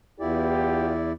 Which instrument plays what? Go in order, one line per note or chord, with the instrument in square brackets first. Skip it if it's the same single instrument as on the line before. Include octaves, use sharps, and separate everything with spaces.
[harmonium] E2 E4 D5 [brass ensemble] B3 F4 G4